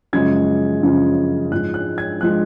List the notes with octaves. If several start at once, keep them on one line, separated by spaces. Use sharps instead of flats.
F#2 C#3 F3 G#3 G#6
F#2 C#3 F3 G#3
G#2 F3 G#3 F#6
F#6
G#6
F3 G#3 F#6